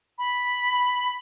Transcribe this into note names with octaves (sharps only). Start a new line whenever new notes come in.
B5